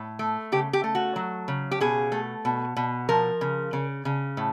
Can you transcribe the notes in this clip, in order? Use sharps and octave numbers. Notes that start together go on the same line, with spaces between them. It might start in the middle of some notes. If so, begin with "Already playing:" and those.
Already playing: A2
A3
C#3 G4
G4
A3
F#4
F#3
C#3
G4
B2 G#4
A3
B2
B2
F3 A#4
C#3
C#3
C#3
A2